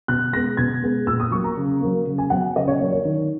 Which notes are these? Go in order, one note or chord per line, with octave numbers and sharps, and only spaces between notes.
B2 F#6
G#3 B3 A#6
B2 G#6
G#3 B3
A#2 E6
D#6
F#3 A#3 C#6
A#5
C#3
F#3 A#3
C#3
G#5
F#3 B3 F#5
C#3 D#5
C#5
F#3 A#3 C#5
C#5
D#3